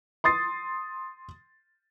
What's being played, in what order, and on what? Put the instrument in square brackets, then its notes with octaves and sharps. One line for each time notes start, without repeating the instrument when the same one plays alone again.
[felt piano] C6 D#6 A6 C7